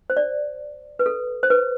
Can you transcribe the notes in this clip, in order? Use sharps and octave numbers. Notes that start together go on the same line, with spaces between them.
C5
D5
B4
A4
C5
B4